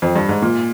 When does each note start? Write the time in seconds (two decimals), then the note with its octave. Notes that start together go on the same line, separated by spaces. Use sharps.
0.02 F2
0.16 G2
0.29 G#2
0.42 A#2